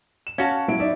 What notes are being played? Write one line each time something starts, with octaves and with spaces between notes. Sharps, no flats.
E7
C#4 F#4 F5 F#5 A5
F#3 E4 D7
D#4 D5 E5